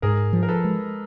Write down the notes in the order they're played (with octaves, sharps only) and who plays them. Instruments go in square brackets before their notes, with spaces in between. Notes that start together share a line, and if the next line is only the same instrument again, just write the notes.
[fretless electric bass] G#2 [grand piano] G#4 A#4
[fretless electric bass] F3
[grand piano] A#4
A4 B4
[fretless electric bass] G#3